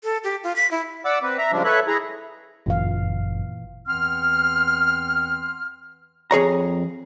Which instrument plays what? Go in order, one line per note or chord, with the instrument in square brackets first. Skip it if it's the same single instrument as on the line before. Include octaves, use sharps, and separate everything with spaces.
[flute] A4
G4
F4
B6
E4
[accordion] D5 F#5 D6 E6
C4 B4
E5 A#5
C#3 F3 G3 G#3 D4
A4 B4 C#5 E5 F#6
E4 G#4 A#5
[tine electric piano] G1 F#2 [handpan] A#2 E3 F5
[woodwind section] E2 E3 C4 F#5 C6 F6
[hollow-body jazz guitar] F2 G#4 C#5 A#5